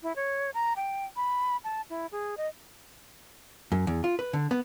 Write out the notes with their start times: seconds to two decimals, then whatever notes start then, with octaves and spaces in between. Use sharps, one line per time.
0.03 E4
0.16 C#5
0.54 A#5
0.76 G5
1.16 B5
1.64 A5
1.90 E4
2.12 G#4
2.37 D#5
3.72 F#2
3.87 E2
4.04 F4
4.19 B4
4.33 D3
4.51 B3